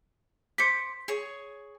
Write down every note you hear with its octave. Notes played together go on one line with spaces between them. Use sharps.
C5 D6 B6 C#7
G#4 C#5